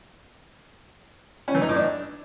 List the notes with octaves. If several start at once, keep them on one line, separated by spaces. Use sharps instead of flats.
C#4
E3
D#4
A2
D4